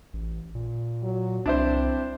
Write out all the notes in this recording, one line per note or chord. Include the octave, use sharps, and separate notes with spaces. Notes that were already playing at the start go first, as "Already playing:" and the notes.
A1
A#2
F#3
C2 C4 D4 E4 C5